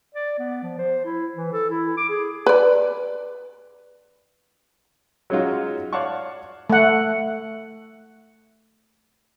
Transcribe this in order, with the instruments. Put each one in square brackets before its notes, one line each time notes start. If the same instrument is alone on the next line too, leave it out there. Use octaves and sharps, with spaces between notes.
[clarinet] D5
B3
F3
C5
E4
E3
A4
E4
D6
G#4
[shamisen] B4 D5
[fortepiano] F#3 G#3 C#4 D#4 F4 F#4
C#5 D5 F5 F#5 A5 C#6
[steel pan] A3 F#5